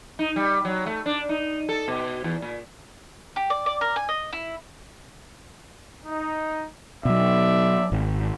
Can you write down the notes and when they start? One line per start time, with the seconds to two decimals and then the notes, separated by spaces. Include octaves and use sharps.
0.19 D#4
0.36 G3
0.65 F#3
0.86 A3
1.06 D4
1.29 D#4
1.69 A4
1.88 B2
2.24 E2
2.42 A#2
3.36 G4
3.50 D5
3.66 D5
3.81 A#4
3.96 G#5
4.09 D#5
4.33 E4
6.06 D#4
7.05 B2 F#3 D5 E5
7.92 G#1